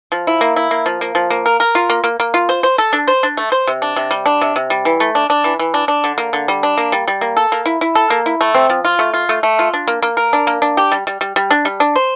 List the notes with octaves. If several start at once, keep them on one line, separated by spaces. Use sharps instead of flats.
F3
E4
A#3
E4
A#3
F3
A#3
F3
A#3
A#4
A#4
F4
A#3
A#3
A#3
F4
C5
C5
A4
D4
C5
D4
A3
C5
C3
D4
C3
G3
D4
C3
C3
G3
E3
A3
D4
D4
E3
E3
D4
D4
D3
A#3
D3
G3
D4
A#3
G3
G3
A#3
A4
A#3
E4
E4
A4
A#3
E4
A3
C4
F3
F4
A3
F4
A3
A3
F4
D4
A#3
A#3
A#4
D4
A#3
D4
G4
G3
G3
G3
G3
D4
G3
D4
C5